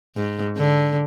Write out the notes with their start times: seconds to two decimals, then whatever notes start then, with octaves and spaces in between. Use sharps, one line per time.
0.16 G#2
0.57 D3